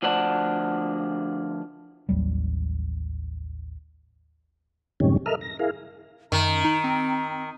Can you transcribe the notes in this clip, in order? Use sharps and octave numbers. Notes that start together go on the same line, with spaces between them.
D2 F3 D4 F#5
A1 D#2 F#3 G3
F#2 A2 C3 D#3 G3 C#4
A4 A#4 D#5 E5 F6
A#6
E4 G#4 A#4 F5
F#2 D#3 A#5
D#4
C4